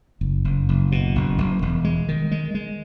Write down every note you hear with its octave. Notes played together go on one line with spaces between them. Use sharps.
F#1
F#1
F#1
B2
F#1
F#1
E1
G#3
D#3
G#3
G#3